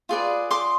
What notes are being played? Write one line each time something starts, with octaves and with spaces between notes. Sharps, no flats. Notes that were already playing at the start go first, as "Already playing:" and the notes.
F4 G#4 B4 D5
C6 D6